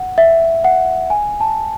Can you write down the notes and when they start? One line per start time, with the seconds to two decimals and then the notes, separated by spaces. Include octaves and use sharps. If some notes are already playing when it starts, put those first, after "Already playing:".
Already playing: F#5
0.18 E5
0.65 F#5
1.10 G#5
1.41 A5